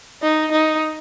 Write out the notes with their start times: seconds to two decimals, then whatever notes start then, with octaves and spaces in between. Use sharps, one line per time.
0.23 D#4
0.52 D#4